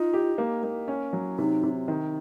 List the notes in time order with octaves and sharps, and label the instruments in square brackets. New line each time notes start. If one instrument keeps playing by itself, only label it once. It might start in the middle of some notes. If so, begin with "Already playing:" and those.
Already playing: [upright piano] D#4 [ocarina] F4
[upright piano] G4
A#3
A#3
C#4
F#3
[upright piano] C3 [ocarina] D#4
[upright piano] C3
D#3